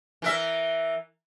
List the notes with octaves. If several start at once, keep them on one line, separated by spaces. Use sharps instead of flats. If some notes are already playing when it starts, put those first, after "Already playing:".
E3 A#4 E5